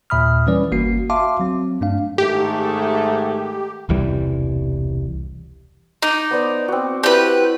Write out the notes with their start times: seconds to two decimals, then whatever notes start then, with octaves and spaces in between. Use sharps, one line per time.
0.10 D#2 A#2 E5 B5 D#6 F6
0.47 E3 G3 C#4 B4 D5
0.72 G1 A#3 F#4 C7
1.10 F#4 E5 F5 A5 C6 D6
1.40 F#3 C4
1.81 G2 A3 D4 F5
2.18 G#2 D#3 A3 G4
3.89 E1 C2 E3 G3
6.02 D#4 D6
6.31 B3 C5 D5
6.68 C4 F#4
7.03 E4 G4 B4 C5 D5